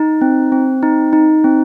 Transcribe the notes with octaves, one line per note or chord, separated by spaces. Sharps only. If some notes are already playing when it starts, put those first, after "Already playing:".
Already playing: D#4
C4
C4
D#4
D#4
C4